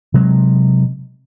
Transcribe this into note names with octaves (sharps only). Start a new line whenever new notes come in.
C3 F#3 G#3